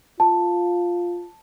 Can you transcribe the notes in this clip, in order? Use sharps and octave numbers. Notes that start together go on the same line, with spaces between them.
F4 A5